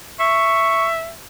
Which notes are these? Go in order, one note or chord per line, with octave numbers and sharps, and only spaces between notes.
E5 C#6